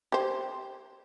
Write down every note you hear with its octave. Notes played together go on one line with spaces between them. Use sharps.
G4 C5